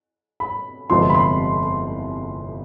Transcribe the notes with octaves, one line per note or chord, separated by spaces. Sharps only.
B5
G1 F2 C3 F3 G#3 C6
B5
C6